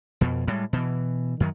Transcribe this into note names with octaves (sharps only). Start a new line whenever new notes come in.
F2 B2
A2 G3 G#3
B2 E3
F#2 D#3 F#3